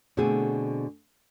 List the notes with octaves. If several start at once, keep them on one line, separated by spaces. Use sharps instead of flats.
B2 D3 A3 C4 G#4